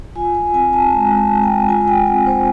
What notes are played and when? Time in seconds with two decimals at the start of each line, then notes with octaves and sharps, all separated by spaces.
0.15 F4 G#5
0.35 G#5
0.54 C4 G#5
0.73 A5
0.92 G#3 A#5
1.18 A5
1.31 G#3
1.43 G5
1.69 F4 G#5
1.81 G#5
1.88 G5
2.07 C4 F#5
2.27 C5